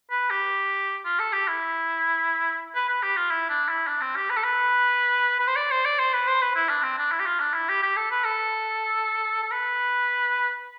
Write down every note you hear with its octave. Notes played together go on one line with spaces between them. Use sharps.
B4
G4
F4
A4
G4
E4
B4
B4
G4
F4
E4
D4
E4
D4
C4
G4
B4
A4
B4
B4
C5
D5
C5
D5
C5
B4
C5
B4
E4
D4
C4
D4
E4
G4
F4
D4
E4
G4
G4
A4
B4
A4
A4
B4